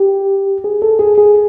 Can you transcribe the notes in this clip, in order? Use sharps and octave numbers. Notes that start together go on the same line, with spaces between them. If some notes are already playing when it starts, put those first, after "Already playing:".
Already playing: G4
G#4
A4
G#4
G#4